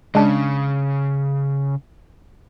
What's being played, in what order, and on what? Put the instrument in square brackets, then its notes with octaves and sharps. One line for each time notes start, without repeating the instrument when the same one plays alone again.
[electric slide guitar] C#3 [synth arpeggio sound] G#3 D4